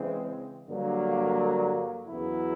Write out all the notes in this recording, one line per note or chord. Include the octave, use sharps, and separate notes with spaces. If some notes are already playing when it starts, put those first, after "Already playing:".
Already playing: C#3 E3 G#3 C4
G2 D3 F#3 A#3
E2 C#3 F#3 B3 E4